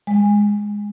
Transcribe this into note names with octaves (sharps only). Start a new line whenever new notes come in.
G#3